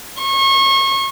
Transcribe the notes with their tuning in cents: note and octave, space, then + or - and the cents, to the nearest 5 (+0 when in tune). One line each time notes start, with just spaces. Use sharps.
C#6 -35